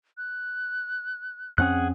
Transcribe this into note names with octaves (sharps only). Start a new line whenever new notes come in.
F#6
F2 C4 C#4 G#4 F#5 F#6